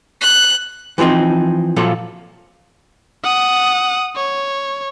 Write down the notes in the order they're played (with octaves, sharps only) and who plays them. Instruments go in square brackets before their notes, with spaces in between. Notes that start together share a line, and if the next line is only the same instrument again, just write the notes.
[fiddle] F#6
[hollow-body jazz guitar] E3 F3 G3 C4 D#4
A#2 F3 F#3 F4 A4
[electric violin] F#5 D#6
C#5